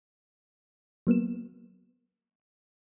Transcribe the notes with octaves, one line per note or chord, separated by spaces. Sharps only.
F#3 A#3 B3 E7